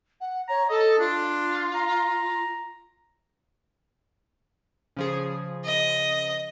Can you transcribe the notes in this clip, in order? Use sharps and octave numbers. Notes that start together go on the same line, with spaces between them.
F#5
C#5 A#5
A4 D#5
D4 F4
A#5
C#3 F3 G#4
D#5